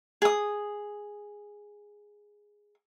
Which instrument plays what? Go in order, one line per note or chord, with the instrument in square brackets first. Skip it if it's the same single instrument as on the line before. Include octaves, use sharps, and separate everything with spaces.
[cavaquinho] G#4 D#6